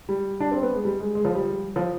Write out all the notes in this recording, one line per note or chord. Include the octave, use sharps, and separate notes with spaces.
G3
D4
C4
B3
G#3
G3
G#3
G#3
F3
G3
F3